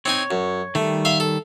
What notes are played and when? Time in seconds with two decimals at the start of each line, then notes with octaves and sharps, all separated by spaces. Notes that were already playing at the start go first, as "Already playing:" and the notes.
0.06 C4 D#4 C#5 G#5
0.31 F#2
0.75 D#3 G3 A3
1.05 E5 F5 C6
1.20 A4